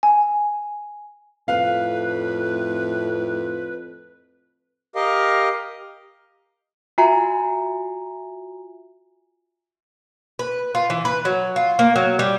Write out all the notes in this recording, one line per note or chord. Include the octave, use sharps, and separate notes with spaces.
G#5
F2 A2 B4 F5
G4 A#4 D#5 F5
F4 F#4 E5 G#5 A#5
B4
F4
E3
B4
F#3
F4
A#3
F#3
G3